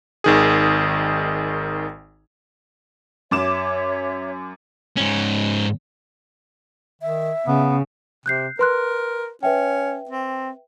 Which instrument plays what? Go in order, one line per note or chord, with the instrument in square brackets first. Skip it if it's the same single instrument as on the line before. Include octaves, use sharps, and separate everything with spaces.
[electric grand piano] G#1 D#3 G#4
[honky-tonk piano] F#2 D6 E7 [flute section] C#5 E5
[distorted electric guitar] G#2 C#4
[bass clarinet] D#3 [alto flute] E5
[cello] C#3 [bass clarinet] B3
[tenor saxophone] C3 [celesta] F#6 G6 C7
[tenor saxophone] A#4 [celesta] B4 C6 F#6
[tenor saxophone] C#4 [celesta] B4 E5 G5
[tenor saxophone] C4